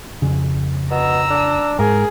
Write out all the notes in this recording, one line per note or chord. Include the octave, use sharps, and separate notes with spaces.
F2 C#3
B2 A#5 E6
D4
G#2 G#4 A#4